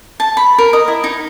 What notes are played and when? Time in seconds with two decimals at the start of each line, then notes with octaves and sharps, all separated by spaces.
0.20 A5
0.37 B5
0.58 A#4
0.73 D#5
0.88 E4
1.04 D#4